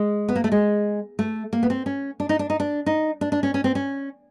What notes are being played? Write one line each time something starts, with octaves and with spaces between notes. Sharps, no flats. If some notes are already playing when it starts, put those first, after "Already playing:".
Already playing: G#3
B3
A#3
A3
G#3
A3
A#3
B3
C4
C#4
D4
D#4
D4
D#4
D4
D#4
D4
D4
C#4
C#4
C4
C#4